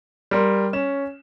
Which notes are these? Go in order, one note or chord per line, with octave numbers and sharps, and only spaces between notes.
G3 A#4 C6
C#4 E7